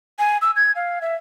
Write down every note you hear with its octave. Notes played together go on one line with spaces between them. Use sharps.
G#5
E6
G#6
F5
E5